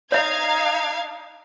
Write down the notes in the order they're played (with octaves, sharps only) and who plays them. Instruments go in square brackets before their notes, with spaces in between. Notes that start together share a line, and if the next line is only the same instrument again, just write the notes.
[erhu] D#4 [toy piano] C#5 E5 [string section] F5 G#6